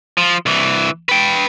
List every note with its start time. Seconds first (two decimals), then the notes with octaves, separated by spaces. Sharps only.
0.18 F3
0.46 C2 E3
1.09 B4 G5